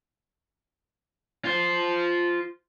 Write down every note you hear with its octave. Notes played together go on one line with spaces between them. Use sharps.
F4 C5